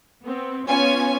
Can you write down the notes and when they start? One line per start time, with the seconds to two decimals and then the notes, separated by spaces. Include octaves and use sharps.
0.24 B3 C4
0.66 B3 C#4 F4 C#5 G#5